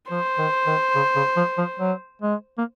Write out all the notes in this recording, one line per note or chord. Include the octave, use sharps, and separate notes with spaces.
F3 C5
D#3
D#3
C#3
C#3
F3
F3
F#3
G#3
A#3